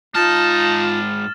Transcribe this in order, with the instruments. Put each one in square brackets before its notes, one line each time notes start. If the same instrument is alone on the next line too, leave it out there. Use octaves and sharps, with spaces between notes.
[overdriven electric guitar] G#2 A5 [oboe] D#4 [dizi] F4 [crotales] F6 A6 E7